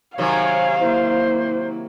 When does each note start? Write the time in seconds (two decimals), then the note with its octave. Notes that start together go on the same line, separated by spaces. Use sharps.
0.18 C3 D#3 F#3 C#5 F5 G#5
0.79 A#3 E4 C5